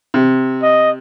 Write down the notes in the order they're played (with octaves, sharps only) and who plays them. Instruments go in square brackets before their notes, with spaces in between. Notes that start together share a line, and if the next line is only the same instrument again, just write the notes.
[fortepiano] C3
[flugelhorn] D#5